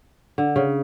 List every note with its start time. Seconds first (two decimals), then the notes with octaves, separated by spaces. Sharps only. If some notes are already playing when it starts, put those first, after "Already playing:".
0.38 D3
0.56 C#3